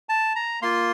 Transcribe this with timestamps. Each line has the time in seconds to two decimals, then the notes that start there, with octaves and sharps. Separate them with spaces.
0.09 A5
0.36 A#5
0.62 A#3 F4 C6